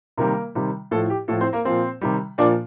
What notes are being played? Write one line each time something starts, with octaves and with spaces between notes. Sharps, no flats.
C3 D#3 G3 A#3 A#4
C3 D#3 G3
A2 F3 A4
G4
A2 F3 A4
C4 C5
A#3 A#4
A#2 F3 C4 C5
C3 D#3 G3
A#2 F3 D4 D5